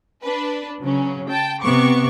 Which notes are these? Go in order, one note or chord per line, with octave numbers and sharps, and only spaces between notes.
D4 B4
C#3 F#3 C#4
G5 A5
C3 B3 C#6 D6